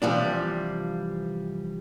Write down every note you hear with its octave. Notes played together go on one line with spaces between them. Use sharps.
C3 E3 F3 G3 D4